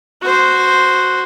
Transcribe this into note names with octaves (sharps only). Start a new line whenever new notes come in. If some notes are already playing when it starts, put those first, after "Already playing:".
F#4 C5